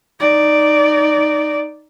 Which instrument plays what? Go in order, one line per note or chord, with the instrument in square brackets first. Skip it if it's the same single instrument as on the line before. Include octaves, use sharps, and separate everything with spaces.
[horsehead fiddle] D#4 D5